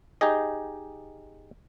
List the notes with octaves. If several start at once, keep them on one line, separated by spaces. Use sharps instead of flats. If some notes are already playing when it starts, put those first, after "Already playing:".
D#4 G4 G#4 D#5